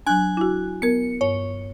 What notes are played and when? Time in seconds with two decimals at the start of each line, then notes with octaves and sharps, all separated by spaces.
0.07 F#3 D4 G#5 F#6
0.37 E4 F#4
0.82 B3 A#4 C#7
1.21 G2 C#5